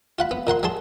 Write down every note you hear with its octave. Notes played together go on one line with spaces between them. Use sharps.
F4 F#5 B5
B3
A#2 A#4 F#5 C6
F#3 G#4 A5 C6